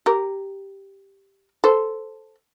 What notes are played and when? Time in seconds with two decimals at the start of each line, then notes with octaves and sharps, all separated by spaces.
0.06 G4 A#4
1.64 A4 C5